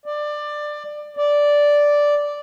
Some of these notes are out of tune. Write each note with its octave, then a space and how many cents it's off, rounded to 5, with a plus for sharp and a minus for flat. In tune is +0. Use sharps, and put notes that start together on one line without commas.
D5 +20
D5 -5